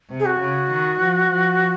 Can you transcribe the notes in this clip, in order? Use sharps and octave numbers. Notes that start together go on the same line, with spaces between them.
C3
G#4
F#4
C#3
D#3
F3
F3